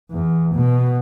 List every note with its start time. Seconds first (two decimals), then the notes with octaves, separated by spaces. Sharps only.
0.11 E2
0.54 B2